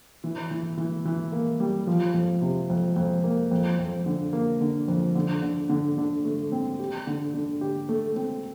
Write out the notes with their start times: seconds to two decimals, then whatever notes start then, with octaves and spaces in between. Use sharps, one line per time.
0.24 E3
0.51 E3
0.78 E3
1.06 E3
1.32 A#3
1.60 G3
1.87 F3
2.14 F2
2.42 C3
2.70 F2
2.96 F2
3.24 A#3
3.51 F2
3.79 F2
4.06 D3
4.33 A#3
4.61 D3
4.88 F2
5.15 D3
5.42 D3
5.69 D3
5.98 D3
6.25 A3
6.52 C4
6.79 G4
7.07 D3
7.34 D3
7.61 G4
7.89 A3
8.16 C4